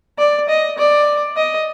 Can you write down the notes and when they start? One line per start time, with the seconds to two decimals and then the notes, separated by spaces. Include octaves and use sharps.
0.18 D5
0.49 D#5
0.78 D5
1.37 D#5